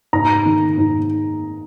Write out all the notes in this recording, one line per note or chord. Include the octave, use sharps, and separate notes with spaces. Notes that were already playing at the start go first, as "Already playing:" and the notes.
G#2 A#5
D#3
G#2